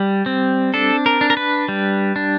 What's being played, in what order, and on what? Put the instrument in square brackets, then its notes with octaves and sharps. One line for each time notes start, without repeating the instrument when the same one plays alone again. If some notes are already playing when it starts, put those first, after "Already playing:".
Already playing: [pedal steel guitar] G3
C4
D4 A4
A#4
D4
A#4
B4
G3
D4